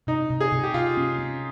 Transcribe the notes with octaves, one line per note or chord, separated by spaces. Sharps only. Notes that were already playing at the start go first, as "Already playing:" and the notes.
C3 D#4
C3
G#4
C3
G4
C3 F4
C#4
C#4